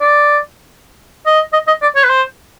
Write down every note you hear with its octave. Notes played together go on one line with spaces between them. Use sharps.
D5
D#5
D#5
D#5
D5
C#5
B4
C5